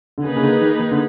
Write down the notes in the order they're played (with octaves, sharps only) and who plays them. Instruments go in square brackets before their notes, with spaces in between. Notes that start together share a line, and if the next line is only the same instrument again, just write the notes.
[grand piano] D3
[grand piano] C#3 [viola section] A#3 D#4 G#4 B4
[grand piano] C#3
D3
D#3
D#3
D3